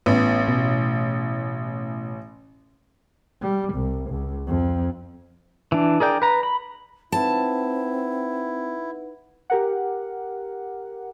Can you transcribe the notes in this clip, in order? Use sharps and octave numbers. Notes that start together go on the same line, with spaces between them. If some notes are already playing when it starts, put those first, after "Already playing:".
A1 B3
B2
G3
C2
C#2
F2
E3 D4
G#4 A#4 D5 G5
B4 A#5
B5
C4 D#4 E4 B4 F#5 A5
G4 A#4 F#5